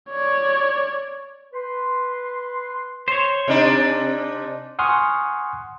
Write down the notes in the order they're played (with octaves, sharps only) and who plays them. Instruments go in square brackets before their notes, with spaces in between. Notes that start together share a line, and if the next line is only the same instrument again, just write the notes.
[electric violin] C#5 D5
[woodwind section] B4 C6
[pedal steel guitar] C5 C#5
[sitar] C3 D4 D#4
[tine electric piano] F#5 G#5 C6 C#6 D#6 F6